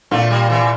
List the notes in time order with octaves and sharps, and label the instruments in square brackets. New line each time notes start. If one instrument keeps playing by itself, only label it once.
[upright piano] A#2 [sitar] A3 C4
[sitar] G3 A#3
C3 E3